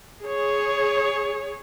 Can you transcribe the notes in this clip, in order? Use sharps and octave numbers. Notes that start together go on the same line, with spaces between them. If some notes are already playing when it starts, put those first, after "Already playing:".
G#4 C#5